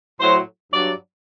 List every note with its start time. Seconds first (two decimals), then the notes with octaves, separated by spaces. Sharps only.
0.20 A2 F#3 C5
0.73 G2 F#3 D5